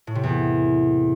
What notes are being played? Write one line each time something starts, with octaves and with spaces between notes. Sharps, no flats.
A2
C3
E2